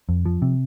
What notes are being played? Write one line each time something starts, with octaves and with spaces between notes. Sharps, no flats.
F2
F3
C3